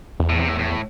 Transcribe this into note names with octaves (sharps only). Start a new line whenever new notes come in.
E2
A2
C3
A2
A2